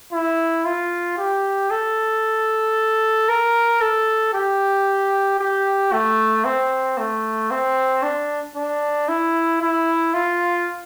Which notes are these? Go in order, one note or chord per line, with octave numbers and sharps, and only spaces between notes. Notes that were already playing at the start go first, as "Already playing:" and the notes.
E4
F4
G4
A4
A#4
A4
G4
G4
A3
C4
A3
C4
D4
D4
E4
E4
F4